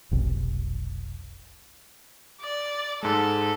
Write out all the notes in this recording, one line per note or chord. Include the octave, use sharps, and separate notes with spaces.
F1 B1
D5
G#2 G#3 A4